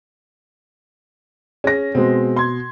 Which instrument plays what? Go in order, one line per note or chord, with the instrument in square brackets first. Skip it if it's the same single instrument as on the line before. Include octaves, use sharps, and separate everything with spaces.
[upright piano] C#4 [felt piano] G#4 A#6
[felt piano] B2 [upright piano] G#3 C4
[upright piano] C6 G#6